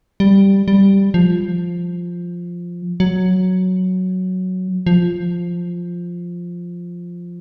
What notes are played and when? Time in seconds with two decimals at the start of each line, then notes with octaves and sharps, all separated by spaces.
0.20 G3
0.68 G3
1.14 F3
3.00 F#3
4.87 F3